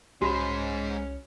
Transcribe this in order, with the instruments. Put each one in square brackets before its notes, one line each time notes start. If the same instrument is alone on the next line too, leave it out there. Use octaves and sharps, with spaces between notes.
[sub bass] C2 [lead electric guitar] G#3 C5 [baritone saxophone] C#4 [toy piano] F#4 B5